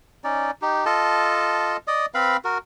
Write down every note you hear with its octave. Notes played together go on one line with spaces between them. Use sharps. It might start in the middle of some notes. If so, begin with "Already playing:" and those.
C#4 D#4 D5
D#4 G4
F4 A4 D#5 A5
D5 D#5 D#6
C4 B4 F5 B5
F#4 A#4